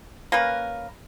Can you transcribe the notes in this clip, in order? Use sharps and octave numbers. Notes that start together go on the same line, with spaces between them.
A#3 C#4 A#4 B4